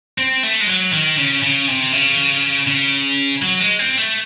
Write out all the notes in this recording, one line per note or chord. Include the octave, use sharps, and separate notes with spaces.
C4
A3
G#3
F#3
D#3
C#3
C#3
C3
C#3
C#3
F#3
G#3
C4
A3